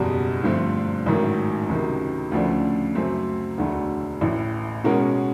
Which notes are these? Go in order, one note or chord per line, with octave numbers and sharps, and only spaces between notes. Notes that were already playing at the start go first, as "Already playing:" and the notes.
Already playing: F#1 E2 B2 G3
G2 D3 F3 A3 C4
A1 G#2 D#3 F#3 A3
C#2 C3 D#3 F#3
D2 C#3 F3 A3 D4
F#2 C#3 F#3 A3 C4
E1 D2 D3 F#3 A3
A1 A2 E3
B2 G#3 C#4 F#4 A#4